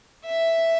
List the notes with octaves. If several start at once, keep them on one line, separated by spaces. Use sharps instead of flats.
E5